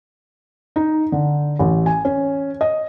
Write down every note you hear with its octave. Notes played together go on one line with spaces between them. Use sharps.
D#4
D3
A1
G#5
C#4
D#5